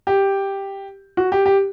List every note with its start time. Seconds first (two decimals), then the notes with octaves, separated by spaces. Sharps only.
0.07 G4
1.17 F#4
1.32 G4
1.46 G4